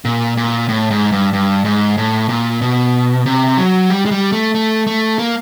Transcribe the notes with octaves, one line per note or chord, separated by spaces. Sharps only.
A#2
A#2
A2
G#2
G2
G2
G#2
A2
A#2
B2
C3
F#3
G3
G#3
G3
A3
A3
A3
A#3